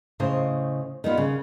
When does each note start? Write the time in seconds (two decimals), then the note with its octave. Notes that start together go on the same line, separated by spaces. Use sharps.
0.20 A2 C#3 C5 D#5
1.04 D#3 G3 B3 F4
1.17 C#3